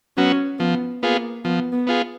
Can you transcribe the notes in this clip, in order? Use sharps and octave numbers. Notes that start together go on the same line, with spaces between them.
F#3 B3 C#4 F#4
F3 B3
A#3 B3 F4 G#4
F3 B3
B3
B3 F4 G#4